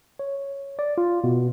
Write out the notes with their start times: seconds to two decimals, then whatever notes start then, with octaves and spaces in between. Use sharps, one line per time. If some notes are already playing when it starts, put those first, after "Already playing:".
0.19 C#5
0.79 D5
0.98 F4
1.24 B2